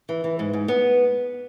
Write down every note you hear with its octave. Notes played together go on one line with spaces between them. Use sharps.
E3
E3
G#2
G#2
B3